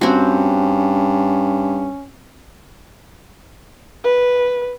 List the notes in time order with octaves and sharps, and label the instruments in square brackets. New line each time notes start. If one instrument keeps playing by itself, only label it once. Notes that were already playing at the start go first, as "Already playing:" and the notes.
[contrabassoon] G2 [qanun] C4 F#4 [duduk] C#4
[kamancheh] B4